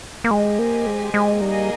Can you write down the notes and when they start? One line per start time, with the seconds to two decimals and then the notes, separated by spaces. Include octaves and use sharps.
0.24 A#3
0.31 G#3 G4 C5 D#5 G#5
0.59 A#3
0.87 G#3
1.14 G#3
1.41 G3 A#3 D#4 G#4 D#5